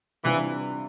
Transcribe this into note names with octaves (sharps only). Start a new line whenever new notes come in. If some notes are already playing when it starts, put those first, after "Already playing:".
C3 E3 G3 D4 F4